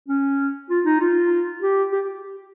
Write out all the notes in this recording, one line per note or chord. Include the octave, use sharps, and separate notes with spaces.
C#4
F4
D#4
F4
G4
G4